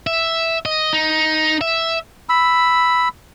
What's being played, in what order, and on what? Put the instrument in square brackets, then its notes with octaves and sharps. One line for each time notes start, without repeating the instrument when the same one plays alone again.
[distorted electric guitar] E5
D#5
D#4
E5
[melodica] B5 E6